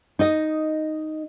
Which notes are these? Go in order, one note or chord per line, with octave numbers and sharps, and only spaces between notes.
D#4 D#5